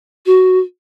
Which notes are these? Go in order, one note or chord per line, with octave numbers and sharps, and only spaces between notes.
F#4